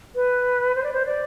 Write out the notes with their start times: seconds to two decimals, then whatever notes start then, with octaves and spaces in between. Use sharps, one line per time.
0.15 B4
0.75 C5
0.83 D5
0.92 C5
1.05 D5